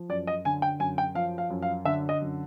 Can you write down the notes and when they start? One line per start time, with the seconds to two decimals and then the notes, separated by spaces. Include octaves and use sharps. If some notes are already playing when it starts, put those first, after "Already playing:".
Already playing: F3
0.09 F#2 D5
0.27 D#5
0.45 D3 G#5
0.62 G5
0.79 F#2 G#5
0.98 G5
1.15 F3 F5
1.38 F5
1.50 F#2
1.62 F5
1.85 D3 E5
2.09 D#5
2.21 F#2